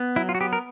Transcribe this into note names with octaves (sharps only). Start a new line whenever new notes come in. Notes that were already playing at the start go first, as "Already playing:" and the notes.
Already playing: B3
F#3 E4
F4
F#4
B3 G4
A#4